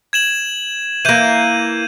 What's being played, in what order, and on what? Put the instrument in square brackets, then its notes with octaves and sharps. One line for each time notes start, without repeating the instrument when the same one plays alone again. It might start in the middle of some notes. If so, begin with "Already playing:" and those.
[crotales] G#6 E7 F#7
[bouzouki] E3 A#3 [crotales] G6 D#7